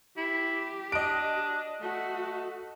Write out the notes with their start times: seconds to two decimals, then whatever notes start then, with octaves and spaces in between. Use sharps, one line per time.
0.17 E4 G4
0.92 D4 D#5 D7
1.81 A3 F#4